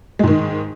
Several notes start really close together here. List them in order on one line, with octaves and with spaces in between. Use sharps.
G#3 G#2 D#3